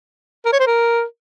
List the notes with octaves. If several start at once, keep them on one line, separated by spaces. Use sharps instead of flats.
A#4
C#5
C5
A#4